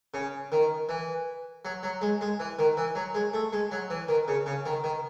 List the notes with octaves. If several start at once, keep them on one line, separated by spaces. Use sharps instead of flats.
C#3
D#3
E3
F#3
F#3
G#3
G#3
E3
D#3
E3
F#3
G#3
A3
G#3
F#3
E3
D#3
C#3
C#3
D#3
D#3